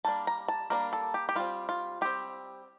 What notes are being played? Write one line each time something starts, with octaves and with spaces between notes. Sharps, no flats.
G3 A#3 D4 A5
A#5
A5
G3 A#3 D4 A#4
A4
G4
G4
G3 C4 F4
F4
G3 C4 G4